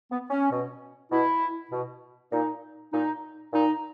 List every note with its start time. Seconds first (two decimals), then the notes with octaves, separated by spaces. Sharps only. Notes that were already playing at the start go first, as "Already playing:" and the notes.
0.11 B3
0.31 C#4
0.51 B2
1.11 B2 E4
1.71 B2
2.32 A#2 D#4
2.93 A#2 D#4
3.53 A#2 D#4